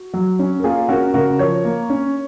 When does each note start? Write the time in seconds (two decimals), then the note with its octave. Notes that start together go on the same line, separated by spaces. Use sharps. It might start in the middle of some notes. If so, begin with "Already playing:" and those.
Already playing: F#4
0.13 F#3
0.39 C#4
0.59 A#4
0.64 A#3 F4 G#4
0.89 C#4 F#4 A#4
1.14 C#3 F#4 A#4
1.39 F3 A#4 C#5
1.65 A#3
1.90 C#4